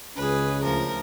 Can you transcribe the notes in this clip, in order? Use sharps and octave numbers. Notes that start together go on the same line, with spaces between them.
C#2 C#4 G#4 B4
D2 F3 A#4